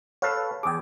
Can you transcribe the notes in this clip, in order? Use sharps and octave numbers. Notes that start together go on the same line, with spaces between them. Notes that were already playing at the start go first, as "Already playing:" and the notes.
A4 B4 C#5 F5
E2 G#4 G5 D6